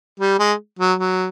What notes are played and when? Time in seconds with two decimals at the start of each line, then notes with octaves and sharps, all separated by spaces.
0.20 G3
0.39 G#3
0.79 F#3
0.99 F#3